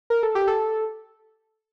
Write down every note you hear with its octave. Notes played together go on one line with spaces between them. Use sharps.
A#4
A4
G4
A4